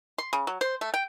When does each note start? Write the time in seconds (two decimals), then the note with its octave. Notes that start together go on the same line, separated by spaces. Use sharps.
0.18 C6
0.33 C#3
0.47 F#3
0.61 C5
0.81 A3
0.94 G5